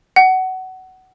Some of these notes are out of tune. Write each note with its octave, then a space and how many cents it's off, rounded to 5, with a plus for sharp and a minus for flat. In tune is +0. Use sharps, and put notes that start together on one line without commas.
F#5 +20